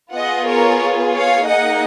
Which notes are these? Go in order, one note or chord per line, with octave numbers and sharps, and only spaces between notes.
B3 F4 G#4 D#5 F#5
A#4 C#5
C#5 F5
A#3 D#4 G#4 D#5 F#5